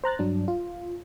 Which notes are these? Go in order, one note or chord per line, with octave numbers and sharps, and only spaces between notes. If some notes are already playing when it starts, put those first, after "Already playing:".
C5 A#5 F#6 A6
G2 F#3 D4
F4